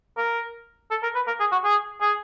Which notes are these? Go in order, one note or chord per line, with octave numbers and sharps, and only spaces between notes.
A#4
A4
A#4
B4
A#4
G#4
F#4
G#4
G#4